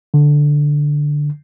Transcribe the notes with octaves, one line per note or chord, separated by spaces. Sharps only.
D3